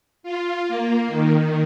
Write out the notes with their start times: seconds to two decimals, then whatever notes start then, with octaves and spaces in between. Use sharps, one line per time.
0.23 F4
0.68 A#3
1.08 D#3